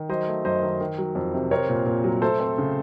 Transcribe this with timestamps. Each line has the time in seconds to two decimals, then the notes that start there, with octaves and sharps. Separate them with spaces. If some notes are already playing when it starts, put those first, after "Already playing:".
Already playing: D#3
0.09 F#3 C5 D#5
0.28 A3
0.45 F#2 C5 D#5
0.62 D#3
0.80 D#3
0.98 F#3
1.15 F2
1.34 C3
1.51 C4 A#4 C#5
1.69 A#2
1.86 A#2
2.04 F#3
2.22 A3 A4 C5
2.40 C4
2.58 C#3